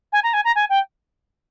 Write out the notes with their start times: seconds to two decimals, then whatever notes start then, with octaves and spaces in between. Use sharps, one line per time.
0.12 G#5
0.23 A#5
0.33 G#5
0.44 A#5
0.55 G#5
0.69 G5